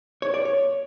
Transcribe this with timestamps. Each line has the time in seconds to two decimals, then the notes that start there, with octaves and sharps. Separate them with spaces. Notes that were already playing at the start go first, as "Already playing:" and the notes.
0.22 C#5
0.34 D5
0.45 C#5